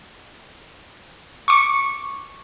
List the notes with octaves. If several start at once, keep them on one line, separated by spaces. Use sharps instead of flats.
C#6 D6 C#7